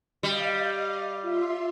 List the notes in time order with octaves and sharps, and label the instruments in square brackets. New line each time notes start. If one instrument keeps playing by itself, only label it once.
[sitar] G3 [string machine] D#5 F5
[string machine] F4 E5 C6